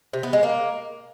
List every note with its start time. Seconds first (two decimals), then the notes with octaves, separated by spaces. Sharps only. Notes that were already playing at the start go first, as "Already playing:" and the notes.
0.13 C3
0.23 B3
0.33 G#3
0.43 A#3